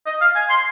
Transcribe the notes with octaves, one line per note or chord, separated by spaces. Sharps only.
D#5
F5
G#5
C6